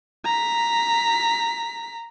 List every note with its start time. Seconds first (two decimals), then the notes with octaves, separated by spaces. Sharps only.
0.25 A#5 B6